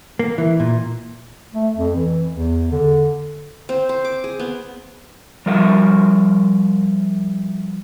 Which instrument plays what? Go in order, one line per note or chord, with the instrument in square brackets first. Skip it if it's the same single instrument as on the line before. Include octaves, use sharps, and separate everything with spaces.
[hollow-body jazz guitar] A#3
E3
A#2
[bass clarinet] A3
F2
E3
E2
D3
[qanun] C4
C5
D6
G#4
B3
[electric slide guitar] F3 G3 A#4 E5 F#5